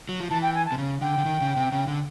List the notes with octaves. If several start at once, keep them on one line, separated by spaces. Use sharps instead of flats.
F#3
F3
E3 A5
G5
G#5
A5
C3
C#3
D3 G5
D3
D#3
C#3
C3
C#3
D3